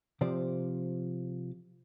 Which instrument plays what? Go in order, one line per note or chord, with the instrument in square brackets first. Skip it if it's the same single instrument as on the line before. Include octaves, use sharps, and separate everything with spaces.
[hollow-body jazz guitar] C3 F3 C5 D5